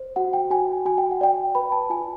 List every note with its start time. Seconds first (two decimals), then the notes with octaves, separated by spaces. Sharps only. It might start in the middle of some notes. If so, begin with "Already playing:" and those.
Already playing: C5
0.16 F#4 F#5
0.33 G5
0.50 F#4 G#5
0.85 F#4 G#5
0.98 G5
1.11 F#5
1.21 D5 G5
1.55 B4 B5
1.72 A5
1.90 F4 G#5